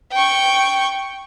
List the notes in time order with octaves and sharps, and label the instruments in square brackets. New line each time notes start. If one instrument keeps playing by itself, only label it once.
[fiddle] G5 C#6